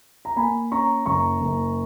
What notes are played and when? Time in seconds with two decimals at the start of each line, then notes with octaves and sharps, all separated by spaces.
0.25 A#5
0.36 A#3 G#5 B5
0.72 C#4 A#5 C#6
1.06 F#1 A#5 C#6
1.41 F#1